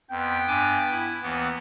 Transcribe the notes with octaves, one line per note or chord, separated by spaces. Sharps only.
F2 B3 G5
G2 G#5 D6
E4
D#2 E3 B3